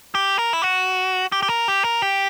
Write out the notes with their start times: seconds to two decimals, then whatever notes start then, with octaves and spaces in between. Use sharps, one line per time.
0.15 G4
0.39 A#4
0.53 E4
0.62 F#4
1.32 G4
1.43 G4
1.49 A#4
1.68 G4
1.84 A#4
2.02 G4